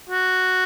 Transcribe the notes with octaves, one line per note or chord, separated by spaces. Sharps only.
F#4